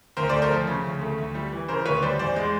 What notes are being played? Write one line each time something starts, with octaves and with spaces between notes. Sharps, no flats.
D2 A#4 C5
A3 C5 D5
A#4 C5
F3
C#3
D2
A3
D2
G3
E3
C#3 A#4 C5
D2 B4 C#5
G3 C5 D5
E2 C5 D5
G#3